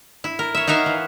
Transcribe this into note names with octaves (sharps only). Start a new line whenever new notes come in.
E4
A#4
C#5 E5
D#4 F#4 A#4 E5 F5
E3